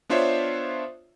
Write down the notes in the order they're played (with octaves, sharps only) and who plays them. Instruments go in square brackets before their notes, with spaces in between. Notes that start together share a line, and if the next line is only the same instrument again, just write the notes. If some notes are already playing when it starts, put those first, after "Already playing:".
[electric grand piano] B3 D4 F4 C5 C#5 E5